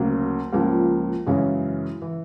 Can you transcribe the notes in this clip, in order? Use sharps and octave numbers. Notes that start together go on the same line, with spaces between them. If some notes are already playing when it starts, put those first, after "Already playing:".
Already playing: D2 C#3 F#3 A#3
C#2 C#3 F3 A#3
F#2 C#3 E3 G#3 C#4
E3